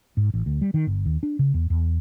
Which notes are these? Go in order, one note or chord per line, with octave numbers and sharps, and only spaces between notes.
G#2
A1
D2
G3
D#3
G1
D#2
D4
C#3
E2
E2